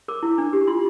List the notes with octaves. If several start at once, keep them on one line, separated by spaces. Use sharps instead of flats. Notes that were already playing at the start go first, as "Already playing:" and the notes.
A#4 D6
E4
D4
G4
F4 C6